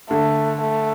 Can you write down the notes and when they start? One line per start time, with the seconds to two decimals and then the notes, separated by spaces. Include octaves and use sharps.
0.10 D3 A3
0.61 A3